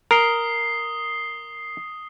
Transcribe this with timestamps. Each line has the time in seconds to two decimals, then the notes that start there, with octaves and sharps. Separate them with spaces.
0.11 A#4 D#6 C7 G7